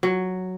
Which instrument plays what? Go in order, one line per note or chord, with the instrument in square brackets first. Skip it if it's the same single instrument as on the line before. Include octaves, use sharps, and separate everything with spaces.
[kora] F#3